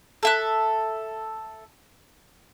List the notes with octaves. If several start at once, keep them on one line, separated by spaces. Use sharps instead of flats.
A4 E5 F#6